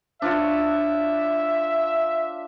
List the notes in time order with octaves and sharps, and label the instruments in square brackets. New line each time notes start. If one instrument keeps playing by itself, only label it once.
[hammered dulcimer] D4 F4 C#5 [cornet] E5